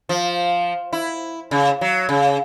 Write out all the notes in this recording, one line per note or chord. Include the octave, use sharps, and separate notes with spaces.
F3
E4
C#3
F#3
C#3